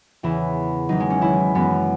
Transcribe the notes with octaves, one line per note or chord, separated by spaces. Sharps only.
E2 C#3 E3 E4
E2 D#3 F#3 D#4
G#3
C#4
E4
F#2 E3 B3